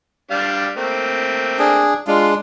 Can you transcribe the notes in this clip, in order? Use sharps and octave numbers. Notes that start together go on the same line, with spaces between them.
G3 D4 F5
A3 A#3 C4
D4 G#4
G#3 D4 F4